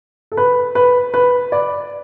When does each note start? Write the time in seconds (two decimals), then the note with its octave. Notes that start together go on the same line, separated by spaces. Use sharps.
0.32 A4
0.37 B4
0.75 B4
1.14 B4
1.52 D5